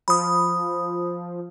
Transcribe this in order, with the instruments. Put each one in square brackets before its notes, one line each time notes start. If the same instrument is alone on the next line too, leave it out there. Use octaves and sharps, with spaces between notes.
[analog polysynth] F3 [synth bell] B5 D#6